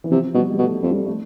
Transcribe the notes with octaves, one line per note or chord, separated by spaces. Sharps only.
E3
C3 F3
B2 G3
G3
B2 A3
F2 A3
G3
A3